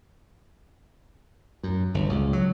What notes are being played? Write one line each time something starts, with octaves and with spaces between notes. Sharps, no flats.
F#2
G1
C#2
F#3